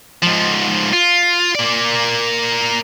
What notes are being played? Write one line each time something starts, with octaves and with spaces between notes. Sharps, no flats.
G#2 F3
F4
A#3 D5